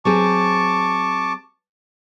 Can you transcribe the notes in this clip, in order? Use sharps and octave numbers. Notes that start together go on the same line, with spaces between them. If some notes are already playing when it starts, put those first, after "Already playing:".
F#3 C4 G#4 A5 C#6 D6